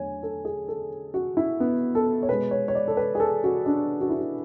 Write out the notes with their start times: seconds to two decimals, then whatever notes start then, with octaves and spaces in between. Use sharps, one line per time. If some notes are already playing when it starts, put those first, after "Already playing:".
Already playing: E2 D3 F#3 A3 C#5 G#5
0.23 A4
0.45 G#4
0.68 A4
1.14 F#4
1.37 E4
1.60 B3
1.95 A4
2.23 C#5
2.28 B2 G#3 B4
2.51 C#5
2.68 C#5
2.75 D5
2.88 A4
2.97 B4
3.15 G#4
3.20 A4
3.44 F#4
3.66 D4
4.01 F#4
4.10 E4
4.19 F#4